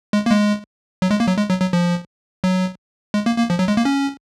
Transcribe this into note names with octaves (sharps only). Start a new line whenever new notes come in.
G#3
A#3
G#3
F#3
G#3
A#3
F#3
G#3
F#3
F#3
F3
F#3
G#3
A#3
A#3
F3
F#3
G#3
A#3
C#4